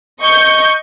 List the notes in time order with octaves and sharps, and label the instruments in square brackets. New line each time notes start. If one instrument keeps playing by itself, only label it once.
[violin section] D#5 C#6 G6